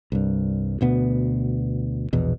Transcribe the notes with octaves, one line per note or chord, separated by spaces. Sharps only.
C2 G2
D2 B2 B3
A#1 E2 B2